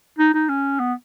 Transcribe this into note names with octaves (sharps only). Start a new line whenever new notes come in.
D#4
D#4
C#4
B3